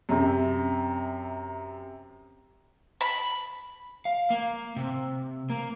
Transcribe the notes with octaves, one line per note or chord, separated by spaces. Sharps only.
F#2 C3
B5
F5
A#3
C3
A#3